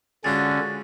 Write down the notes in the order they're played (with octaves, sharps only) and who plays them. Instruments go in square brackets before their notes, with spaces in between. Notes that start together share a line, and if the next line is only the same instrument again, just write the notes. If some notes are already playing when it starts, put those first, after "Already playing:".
[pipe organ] D3 C#4 [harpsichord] G#3 F4 F#4 [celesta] A6